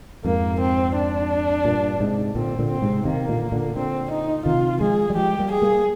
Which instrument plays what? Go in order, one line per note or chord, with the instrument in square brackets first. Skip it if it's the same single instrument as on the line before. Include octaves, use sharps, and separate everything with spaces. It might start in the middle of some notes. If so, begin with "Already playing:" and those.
[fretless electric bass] F2 G#2 [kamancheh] A#3
[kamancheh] C4
D4
[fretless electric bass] G2 A#2
G#2 C3
[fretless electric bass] A#2 D3 [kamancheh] C4
[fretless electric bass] A#2 D3
[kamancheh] C4
[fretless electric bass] G#2 C3
[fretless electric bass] C3 D#3 [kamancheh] A#3
[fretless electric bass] A#2 D3
A#2 D3
[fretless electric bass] A#2 D3 [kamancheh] C4
[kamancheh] D#4
[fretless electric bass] C3 D#3 [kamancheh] F4
[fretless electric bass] F3 G#3 [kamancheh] G#4
[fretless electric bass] G3
[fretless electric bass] F3 G#3 [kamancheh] G4
[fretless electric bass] G3 A#3
[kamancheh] G#4
[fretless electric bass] G3 A#3